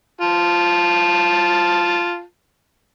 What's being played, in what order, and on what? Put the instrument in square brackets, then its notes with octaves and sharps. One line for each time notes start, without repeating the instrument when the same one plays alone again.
[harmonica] F4 A5